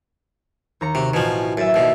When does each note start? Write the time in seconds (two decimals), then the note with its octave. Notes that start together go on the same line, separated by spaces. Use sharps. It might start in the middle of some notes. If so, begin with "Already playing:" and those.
0.81 D#2 A#5 C#7
0.95 C3 F#4
1.14 A1 B2 F3 G#5 E7
1.57 F#2 E5 A6
1.74 D#2 B2